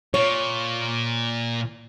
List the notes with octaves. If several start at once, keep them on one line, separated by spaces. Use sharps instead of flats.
A#2 C#5